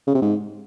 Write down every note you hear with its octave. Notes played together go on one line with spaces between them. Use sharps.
C#3
C3
G#2